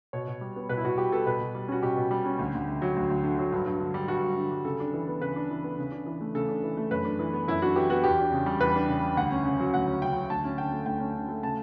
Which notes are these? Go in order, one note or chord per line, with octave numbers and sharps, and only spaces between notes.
B2 C#5
B2
G3
B3
B2 B4
E4
B2 F#4
G3 G4
B3 A4
B2 B4
B2
G3
C#4 F#4
B2 G4
B2
G3
C#4
D2
D2
D3
F#3
D2
D2
D3
F#3
G2
G2
D3
G3
G2 F#4
G2
D3
G3
C#3 A4
D4
E3
B3
C#3 B4
D4
E3
B3
C#3
D4
E3
A3
C#3 A4
D4
E3
A3
F#2 B4
D4
E3
B3
F#2 E4
D4 F#4
E3 G4
B3 F#4
E2 G4
D4
C#3
G3
E2 B4
D4
C#3
G3
D2 F#5
C#4
C#3
F#3
D2 F#5
C#4
C#3 G5
F#3
D2 A5
C#4
D3 G5
A3
D2 G5
C#4
D3
A3
C#3 A5